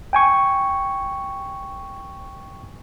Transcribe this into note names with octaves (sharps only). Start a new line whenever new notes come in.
G5 G#5 C#6